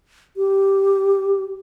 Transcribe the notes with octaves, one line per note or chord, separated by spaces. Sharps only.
G4